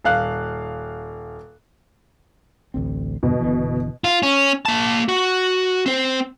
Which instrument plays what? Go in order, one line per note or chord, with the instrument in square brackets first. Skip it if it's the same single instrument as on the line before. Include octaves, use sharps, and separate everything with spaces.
[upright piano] D#1 F5 F#6
[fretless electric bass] A1 D2 C4
[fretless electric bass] E2 G2 D3 [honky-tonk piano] B2
[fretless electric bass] F#1 D3 E3
[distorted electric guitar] F4
C#4
A#3 A5
F#4
C4 C5